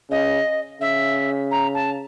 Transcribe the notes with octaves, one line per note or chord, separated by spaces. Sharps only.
C#3 D#5
C#3 E5
A#5
A5